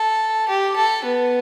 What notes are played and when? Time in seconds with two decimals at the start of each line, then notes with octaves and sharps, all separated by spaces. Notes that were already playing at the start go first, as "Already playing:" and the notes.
Already playing: A4
0.48 G4
0.77 A4
1.05 B3